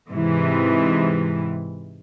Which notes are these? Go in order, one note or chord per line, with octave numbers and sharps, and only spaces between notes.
G#2 C3 E3